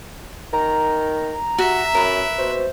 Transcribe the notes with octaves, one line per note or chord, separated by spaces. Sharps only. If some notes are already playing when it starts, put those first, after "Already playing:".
D#3 A#5
F#4 E5
F#2 A#4 B4
B2 C5